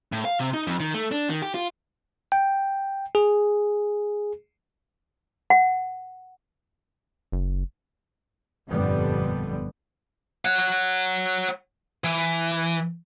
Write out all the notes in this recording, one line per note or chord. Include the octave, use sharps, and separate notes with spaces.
A2
F5
C3
D#4
F2
D#3
A3
D4
D#3
G4
F4
G5
G#4
F#5
F#1
G1 F2 A#2 D3 G3 B3
C#5 F#5
E3